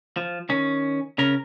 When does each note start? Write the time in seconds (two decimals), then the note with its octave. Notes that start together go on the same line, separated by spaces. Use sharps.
0.17 F3
0.49 D#3 C#4
1.18 C#3 C#4 A#4